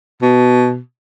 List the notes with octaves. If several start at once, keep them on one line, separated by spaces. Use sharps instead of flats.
B2